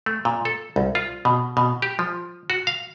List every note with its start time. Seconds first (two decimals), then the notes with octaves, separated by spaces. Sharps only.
0.06 A3
0.25 A#2
0.45 A4
0.76 C2
0.95 F4
1.25 B2
1.57 B2
1.82 G4
1.99 F3
2.50 F#4
2.67 F5